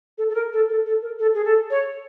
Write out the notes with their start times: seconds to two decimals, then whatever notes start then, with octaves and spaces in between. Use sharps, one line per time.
0.18 A4
0.29 A4
0.35 A#4
0.53 A4
0.69 A4
0.86 A4
1.02 A#4
1.19 A4
1.34 G#4
1.45 A4
1.70 C#5